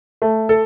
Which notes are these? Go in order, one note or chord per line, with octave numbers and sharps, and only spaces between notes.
A3
A4